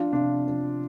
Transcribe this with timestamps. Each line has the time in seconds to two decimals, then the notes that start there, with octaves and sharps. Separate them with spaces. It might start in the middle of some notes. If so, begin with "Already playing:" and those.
Already playing: F3 D4 F4
0.12 C3 D4 F4
0.48 F3